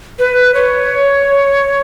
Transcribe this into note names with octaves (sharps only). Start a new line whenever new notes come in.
B4
C#5